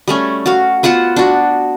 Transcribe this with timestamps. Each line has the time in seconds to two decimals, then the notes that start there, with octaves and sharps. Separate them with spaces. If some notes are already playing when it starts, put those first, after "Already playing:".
0.08 G3 A3 C#4
0.46 F#4 F5
0.83 B3 F4 C5 F#5
1.16 D4 F#4